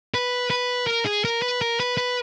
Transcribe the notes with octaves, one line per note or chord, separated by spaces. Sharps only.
B4
B4
A#4
G#4
A#4
B4
A#4
B4
B4